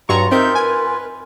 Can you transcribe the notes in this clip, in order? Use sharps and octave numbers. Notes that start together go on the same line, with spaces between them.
G2 F#3 F4 A#5 C#6
C4 D#4 A#4 E5 G6
B4 G#5